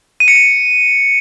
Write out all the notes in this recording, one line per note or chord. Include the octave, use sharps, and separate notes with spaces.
D#7
C#7
D#7